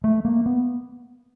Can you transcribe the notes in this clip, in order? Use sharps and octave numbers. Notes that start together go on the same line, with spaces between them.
A3
A#3
B3